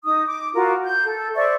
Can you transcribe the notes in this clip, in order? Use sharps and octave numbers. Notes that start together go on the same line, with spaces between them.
D#4 D#6
D6
F4 F#4 A#4
G6
A4
C5 D5 E5 C#6